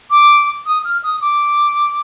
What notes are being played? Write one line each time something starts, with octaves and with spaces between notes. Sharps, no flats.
D6
D#6
F6
D#6
D6